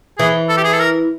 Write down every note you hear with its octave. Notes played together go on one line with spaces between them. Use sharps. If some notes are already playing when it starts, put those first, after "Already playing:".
E3 G#4
A4
G4
G#4
A4
A#4